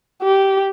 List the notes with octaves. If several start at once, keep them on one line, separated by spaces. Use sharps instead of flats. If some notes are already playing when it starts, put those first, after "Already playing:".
G4